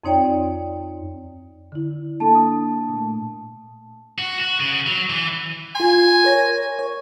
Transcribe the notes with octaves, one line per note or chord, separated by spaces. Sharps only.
F2 C4 D#4 C#5 D5 G5
D3 E4
A#3 D4 A4 A5
D#6
A#2 A3
F#4
F#4
C#3
F#3
E3
F4 G#5 C6
A#4 C#5 A#6
C#5